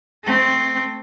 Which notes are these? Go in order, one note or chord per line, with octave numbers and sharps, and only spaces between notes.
A3 C4